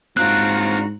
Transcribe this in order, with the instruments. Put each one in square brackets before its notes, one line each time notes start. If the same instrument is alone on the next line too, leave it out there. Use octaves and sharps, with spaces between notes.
[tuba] G#2 [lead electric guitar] C4 D4 [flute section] F4 F#4 A#5 [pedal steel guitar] F#6